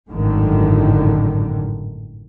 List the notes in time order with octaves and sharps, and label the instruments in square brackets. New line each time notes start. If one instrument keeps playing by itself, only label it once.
[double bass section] G#1 F#2 A2 D3 D#3